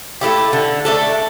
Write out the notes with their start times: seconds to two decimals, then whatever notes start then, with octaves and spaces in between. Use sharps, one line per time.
0.21 A3 E4 G4
0.53 D3
0.85 A3 D4 A4